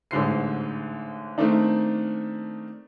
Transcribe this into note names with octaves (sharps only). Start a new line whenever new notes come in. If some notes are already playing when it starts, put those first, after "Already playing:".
A1 G#2 D3 C5 C7
D#3 A3 A#3 C4 D4 D#4